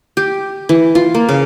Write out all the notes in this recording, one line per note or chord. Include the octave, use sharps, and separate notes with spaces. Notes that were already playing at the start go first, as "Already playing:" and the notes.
G4
E3
F4
A#3
C#3